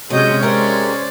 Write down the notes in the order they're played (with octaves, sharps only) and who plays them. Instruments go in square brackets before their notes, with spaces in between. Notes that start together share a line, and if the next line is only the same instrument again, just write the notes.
[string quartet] C3 D#5 G6 [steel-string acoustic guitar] F#3 [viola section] G#3 C#4
[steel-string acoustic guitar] G4 A#4 E5 [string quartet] C5 D5